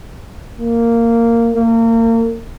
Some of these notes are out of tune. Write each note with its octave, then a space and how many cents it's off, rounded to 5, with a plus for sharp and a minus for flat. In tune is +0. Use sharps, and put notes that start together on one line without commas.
A#3 -10
A#3 -35